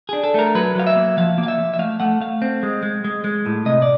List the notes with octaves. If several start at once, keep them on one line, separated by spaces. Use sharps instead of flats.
D4 G#4
A4
A3 A#4
F#3 B4
F#3 F5
E5
A#3
F3 F5
A#3
F5
E5
F3
E5
A3 F5
A3 F#5
A3 F5
C4
G#3
G#3
G#3
G#3
A2
C3 D#5
D5